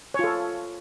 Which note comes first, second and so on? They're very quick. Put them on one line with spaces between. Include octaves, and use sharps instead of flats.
C#5 F4 A4